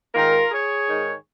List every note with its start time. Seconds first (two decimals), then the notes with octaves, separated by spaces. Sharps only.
0.15 G#2 D#3 F4 A#4
0.51 G#4 C#5
0.86 G#2 D#3